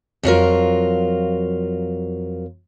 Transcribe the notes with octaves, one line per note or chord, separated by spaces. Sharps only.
F2 F#3 F4 A#4